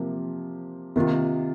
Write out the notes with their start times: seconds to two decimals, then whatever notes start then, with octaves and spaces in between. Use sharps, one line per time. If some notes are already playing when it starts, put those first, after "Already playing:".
Already playing: C3 F3 A#3
0.96 C3 D#3 A#3 F4